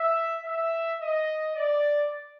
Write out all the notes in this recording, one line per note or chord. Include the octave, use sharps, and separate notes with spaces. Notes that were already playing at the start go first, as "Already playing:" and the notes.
Already playing: E5
E5
D#5
D5